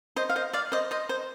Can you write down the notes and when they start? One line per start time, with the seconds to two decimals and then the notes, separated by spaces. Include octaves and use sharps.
0.16 C5 D#5
0.30 F5
0.36 C5 D#5
0.53 D5 F5
0.72 C5 D#5
0.91 C5 D#5
1.09 C5